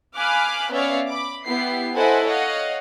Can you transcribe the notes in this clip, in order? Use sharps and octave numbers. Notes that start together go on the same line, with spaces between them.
F5 G#5 B5 D6 F6 F#6
B3 C#4 C#5 D5 E5 F5
B5 D6
B3 E4 G4 C7
E4 A4 C5 D#5 F#5 G#5
C#5 D#5 F5 F#5